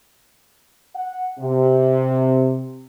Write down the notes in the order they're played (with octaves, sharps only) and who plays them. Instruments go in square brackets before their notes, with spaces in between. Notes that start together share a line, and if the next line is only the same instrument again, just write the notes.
[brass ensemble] F#5
C3